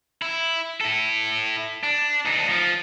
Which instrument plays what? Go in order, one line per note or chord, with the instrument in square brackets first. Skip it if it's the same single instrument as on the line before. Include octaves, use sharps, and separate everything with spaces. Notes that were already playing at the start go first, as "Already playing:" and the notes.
[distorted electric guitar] E4
E4 A4
D4
D2 D#4
F3